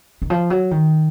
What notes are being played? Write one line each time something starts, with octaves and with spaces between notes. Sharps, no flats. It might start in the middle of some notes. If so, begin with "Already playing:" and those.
D#3
F3
F#3
D#3